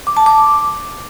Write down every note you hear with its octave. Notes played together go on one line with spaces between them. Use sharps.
D6
A5
D6